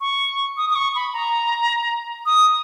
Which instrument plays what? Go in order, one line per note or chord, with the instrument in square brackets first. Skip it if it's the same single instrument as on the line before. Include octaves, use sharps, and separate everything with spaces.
[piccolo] C#6
D#6
D#6
C#6
B5
A#5
D#6